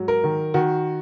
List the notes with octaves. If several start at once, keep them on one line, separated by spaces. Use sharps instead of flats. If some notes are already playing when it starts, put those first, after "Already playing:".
Already playing: G#2 F#3
A#4
D#3
D#3 F#4